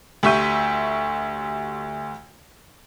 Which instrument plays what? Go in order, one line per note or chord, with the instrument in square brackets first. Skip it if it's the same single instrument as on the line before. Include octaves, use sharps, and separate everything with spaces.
[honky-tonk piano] D2 G4 E5 C#6 G6 D#7